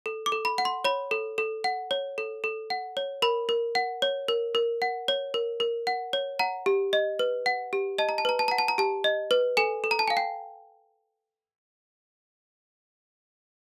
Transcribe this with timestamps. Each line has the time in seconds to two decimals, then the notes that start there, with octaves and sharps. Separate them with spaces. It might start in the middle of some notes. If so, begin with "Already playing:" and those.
0.06 A4
0.26 D6
0.32 A4
0.45 B5
0.58 F#5
0.65 C6
0.85 C#5 B5
1.11 A4
1.38 A4
1.64 F#5
1.91 C#5
2.18 A4
2.44 A4
2.70 F#5
2.97 C#5
3.22 A#4 B5
3.49 A#4
3.75 F#5
4.02 C#5
4.28 A#4
4.55 A#4
4.82 F#5
5.08 C#5
5.34 A#4
5.60 A#4
5.87 F#5
6.13 C#5
6.39 F#5 A#5
6.66 G4
6.93 D#5
7.19 B4
7.46 F#5
7.73 G4
7.98 D#5 A5
8.09 A#5
8.18 A5
8.25 B4 A#5
8.39 A5
8.48 F#5 A#5
8.58 A5
8.68 A#5
8.78 G4 A5
9.04 D#5
9.31 B4
9.57 A4 G#5
9.84 A4
9.91 A#5
9.99 A5
10.08 F5 G#5
10.17 G5